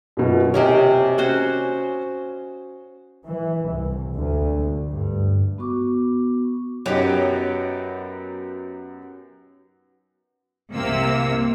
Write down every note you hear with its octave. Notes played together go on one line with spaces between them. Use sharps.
F#2 B2 F4
C3 G4 A#4 C#5 D#5 G#5
C#4 F#4 C5
E3
C2
D2
G2
B3 F#4 C#6 D6
F#2 F#3 B3 D#4 G4
C2 C3 A#3 E6